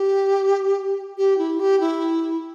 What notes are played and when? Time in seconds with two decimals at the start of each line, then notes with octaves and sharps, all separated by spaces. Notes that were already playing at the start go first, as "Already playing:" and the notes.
Already playing: G4
1.17 G4
1.38 E4
1.60 G4
1.80 E4